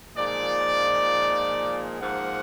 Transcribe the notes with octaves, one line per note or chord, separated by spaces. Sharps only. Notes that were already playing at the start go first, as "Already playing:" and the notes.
A#2 F3 G#3 D#4 D5
G#2 F3 A#3 F#5